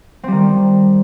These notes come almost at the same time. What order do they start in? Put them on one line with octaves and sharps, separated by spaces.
C4 G3 D#3